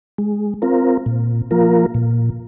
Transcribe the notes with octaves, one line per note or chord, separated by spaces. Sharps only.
G#3
C4 F4 A#4
A#2
F3 A#3 F4 A#4
A#2